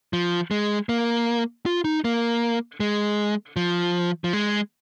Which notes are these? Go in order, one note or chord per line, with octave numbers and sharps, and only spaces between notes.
F3
G#3
A#3
F4
D#4
A#3
G#3
F3
F3
G#3